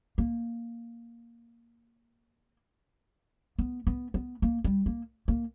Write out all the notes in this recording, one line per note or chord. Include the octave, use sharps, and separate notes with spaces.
A#3
B3
B3
B3
A#3
G3
A#3
A#3